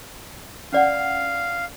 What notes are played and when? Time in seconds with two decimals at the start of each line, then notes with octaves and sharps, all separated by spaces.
0.72 C#4 D5 F5 F#5